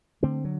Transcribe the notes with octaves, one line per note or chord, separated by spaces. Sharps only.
D3 A3 C4
F#3